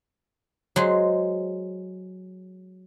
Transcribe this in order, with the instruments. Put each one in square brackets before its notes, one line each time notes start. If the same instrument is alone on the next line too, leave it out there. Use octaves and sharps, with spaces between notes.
[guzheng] F#3 G#3 C5